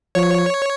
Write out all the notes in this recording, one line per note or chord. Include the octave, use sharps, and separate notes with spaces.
F3 C#5